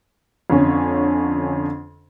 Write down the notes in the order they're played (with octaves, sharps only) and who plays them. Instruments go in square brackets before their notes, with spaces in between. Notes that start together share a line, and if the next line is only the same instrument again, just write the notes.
[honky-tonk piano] F2 D3 C#4